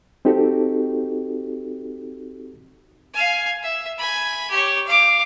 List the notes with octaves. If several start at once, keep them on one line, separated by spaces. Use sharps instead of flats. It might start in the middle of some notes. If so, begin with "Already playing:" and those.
C4 D#4 F#4 G4 A4
F5 G#5
E5
G#5 B5
G4 C#5
F5 D6